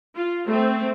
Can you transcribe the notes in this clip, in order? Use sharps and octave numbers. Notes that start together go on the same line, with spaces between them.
F4
A3 C4